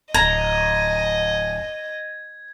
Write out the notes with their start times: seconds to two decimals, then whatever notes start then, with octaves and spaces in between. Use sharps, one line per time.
0.14 D1 D#5 A#5 G#6